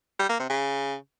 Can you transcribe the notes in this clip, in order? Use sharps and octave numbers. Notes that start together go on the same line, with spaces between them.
G3
A#3
C3
C#3